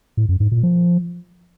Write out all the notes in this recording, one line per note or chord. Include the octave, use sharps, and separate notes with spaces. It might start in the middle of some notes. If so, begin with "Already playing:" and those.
A2
F#2
G#2
A#2
F3